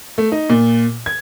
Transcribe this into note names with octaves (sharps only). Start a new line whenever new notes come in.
A3
D#4
A#2
G#6